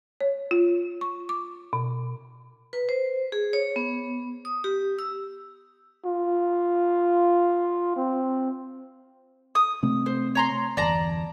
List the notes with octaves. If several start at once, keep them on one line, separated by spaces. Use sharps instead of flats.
C#5
F4
C#6
D6
B2
B4
C5
G#4
C#5
B3
D#6
G4
E6
F4
C4
D#6
C3 A3 C4
C5
C#5 A#5 C6
G1 E2 D5 A5 A#5